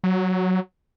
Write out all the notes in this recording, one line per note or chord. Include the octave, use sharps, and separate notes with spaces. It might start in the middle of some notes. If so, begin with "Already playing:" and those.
F#3